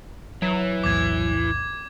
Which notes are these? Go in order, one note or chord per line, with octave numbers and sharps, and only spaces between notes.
E3 F#3
B1 E2 A2 D6 G#6